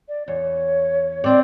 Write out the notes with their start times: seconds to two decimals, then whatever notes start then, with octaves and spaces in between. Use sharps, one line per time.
0.09 D5
0.28 E2 C#5
1.24 C4 D4 D5